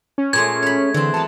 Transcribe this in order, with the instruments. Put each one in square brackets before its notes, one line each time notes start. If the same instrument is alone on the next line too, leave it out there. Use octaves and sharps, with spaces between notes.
[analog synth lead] C#4
[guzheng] A#2 G#3 A3 [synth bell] G#6
[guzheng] C#5 B5
[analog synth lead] D3 [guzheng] E3 C4
[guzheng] F#3 B3 [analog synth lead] A5